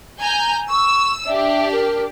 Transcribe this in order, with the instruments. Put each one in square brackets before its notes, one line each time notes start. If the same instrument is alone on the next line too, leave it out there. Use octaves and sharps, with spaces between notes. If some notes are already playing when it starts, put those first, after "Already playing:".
[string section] G#5 A#5 G6
[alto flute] C#6 [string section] E6
[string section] D4 G4 [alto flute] E5
[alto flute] A#4